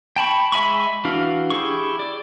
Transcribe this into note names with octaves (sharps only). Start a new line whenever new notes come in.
G5 A5 B5 C#6
G#3 E5 G#5 B5 C#6
E3 D4 F#4 F5
E4 G4 G#4 C#6
D5